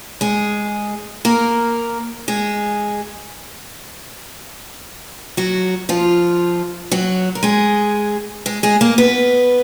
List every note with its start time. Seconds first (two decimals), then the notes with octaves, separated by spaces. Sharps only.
0.21 G#3 G#4
1.25 A#3 A#4
2.28 G#3 G#4
5.37 F#3 F#4
5.89 F3 F4
6.92 F#3 F#4
7.35 A#4
7.43 G#3 G#4
8.46 G#3 G#4
8.63 G#3 G#4
8.81 A#3 A#4
8.98 B3 B4